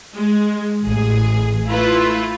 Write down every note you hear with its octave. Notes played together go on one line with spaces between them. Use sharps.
G#3
A1 G#4
A3 E4 F4 B4